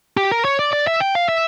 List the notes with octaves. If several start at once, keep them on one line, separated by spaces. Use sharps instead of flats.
G4
A#4
C#5
D5
D5
E5
G5
F5
E5